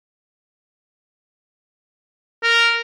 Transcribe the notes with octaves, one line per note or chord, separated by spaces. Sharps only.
A#4